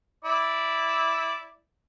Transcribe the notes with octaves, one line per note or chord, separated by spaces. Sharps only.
E4 D5